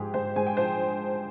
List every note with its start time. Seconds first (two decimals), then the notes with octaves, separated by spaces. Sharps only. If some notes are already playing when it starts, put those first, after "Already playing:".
Already playing: G#2 F3 G#3 G4 G#4
0.14 G#2 C5
0.36 G#2 G#5
0.47 G5
0.57 F3 C5